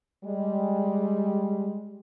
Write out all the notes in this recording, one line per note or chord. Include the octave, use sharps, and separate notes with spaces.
G3 G#3